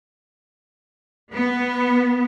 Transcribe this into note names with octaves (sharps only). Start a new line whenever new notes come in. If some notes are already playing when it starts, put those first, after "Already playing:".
B3